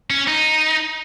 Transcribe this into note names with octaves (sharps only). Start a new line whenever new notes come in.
C#4
D#4